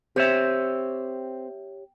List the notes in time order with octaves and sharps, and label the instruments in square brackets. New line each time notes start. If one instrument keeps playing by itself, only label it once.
[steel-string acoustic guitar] C4 [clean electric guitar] G4 C#5 E5